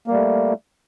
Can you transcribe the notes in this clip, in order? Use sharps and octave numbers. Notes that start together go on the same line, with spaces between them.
G3 A3 A#3